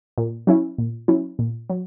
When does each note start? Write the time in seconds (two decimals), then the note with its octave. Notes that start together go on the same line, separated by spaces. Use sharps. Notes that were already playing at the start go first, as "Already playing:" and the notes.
0.18 A#2
0.47 F#3 C#4 E4
0.78 A#2
1.08 F#3 C#4 E4
1.39 A#2
1.70 F#3